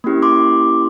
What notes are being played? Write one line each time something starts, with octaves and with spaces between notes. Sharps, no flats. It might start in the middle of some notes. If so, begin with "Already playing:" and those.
A#3 C#4 E4 G4
C6 D6